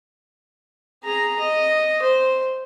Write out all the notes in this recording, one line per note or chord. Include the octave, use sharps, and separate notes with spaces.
G#4 A#5
D#5
C5